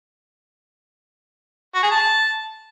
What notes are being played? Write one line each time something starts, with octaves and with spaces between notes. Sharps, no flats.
F#4
G#4
A5